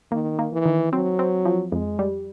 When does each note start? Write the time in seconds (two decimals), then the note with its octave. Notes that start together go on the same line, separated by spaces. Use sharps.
0.11 D#3 A#3
0.39 A#3
0.53 E3
0.66 D#3
0.92 F#3 C4
1.19 C4
1.45 F3
1.72 F2 G#3
1.99 G3